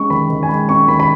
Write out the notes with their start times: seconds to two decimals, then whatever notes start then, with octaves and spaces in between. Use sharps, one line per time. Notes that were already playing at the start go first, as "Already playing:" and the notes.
Already playing: G#3 C#4 C#6
0.10 D#3 B5
0.29 D#3
0.43 G#5
0.49 G#3 B5
0.69 C#4 C#6
0.88 D#3 B5
1.00 B5